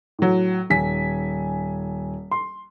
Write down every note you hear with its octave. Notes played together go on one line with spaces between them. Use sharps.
A2 F#3
D#1 G#5 B6
C6